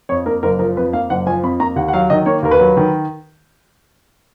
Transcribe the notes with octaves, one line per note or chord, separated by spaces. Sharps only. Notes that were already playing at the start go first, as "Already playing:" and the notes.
F2 C#5
A#3 A#4
F#1 A#4
F3 A#4
F2 B4
A#3 F5
F#1 F#5
F3 G#5
F2 B5
A#3 A#5
D#2 F#5
F#5
F#3 F5
D#3 D#5
A#3 C#5
D#2 A#4
B4
F#3
D#3